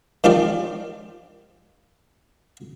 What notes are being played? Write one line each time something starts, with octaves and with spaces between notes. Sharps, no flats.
D#3 F3 C#4 F4 G4 D5